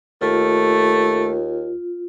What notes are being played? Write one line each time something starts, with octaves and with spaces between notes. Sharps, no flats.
D#2 A3 F4